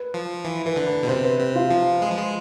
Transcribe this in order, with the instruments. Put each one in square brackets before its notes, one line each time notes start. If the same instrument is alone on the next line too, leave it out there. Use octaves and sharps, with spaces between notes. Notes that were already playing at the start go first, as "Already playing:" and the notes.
Already playing: [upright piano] B4
[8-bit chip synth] F3
E3
[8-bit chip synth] E3 [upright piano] B4
[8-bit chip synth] D3
[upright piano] B4
[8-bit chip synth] B2
[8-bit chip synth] C3 [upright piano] C5
[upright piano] B4
[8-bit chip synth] C3
[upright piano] F4
[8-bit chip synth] F3
G#3
F3
G#3